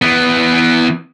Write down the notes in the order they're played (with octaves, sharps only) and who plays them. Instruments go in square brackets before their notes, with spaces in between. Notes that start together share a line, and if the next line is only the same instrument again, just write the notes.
[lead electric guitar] E3 B3